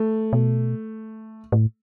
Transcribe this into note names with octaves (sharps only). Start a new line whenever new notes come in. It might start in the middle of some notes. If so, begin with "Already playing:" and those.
Already playing: A3
B2
A2